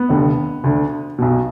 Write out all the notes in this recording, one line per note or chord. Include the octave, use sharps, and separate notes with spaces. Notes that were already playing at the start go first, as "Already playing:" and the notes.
Already playing: B3
F1 D#2 D3
D2 D3
B1 B2